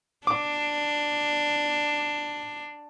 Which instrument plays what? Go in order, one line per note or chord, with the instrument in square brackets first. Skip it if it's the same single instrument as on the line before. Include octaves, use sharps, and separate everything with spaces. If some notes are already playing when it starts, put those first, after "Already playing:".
[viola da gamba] D4 [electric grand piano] D6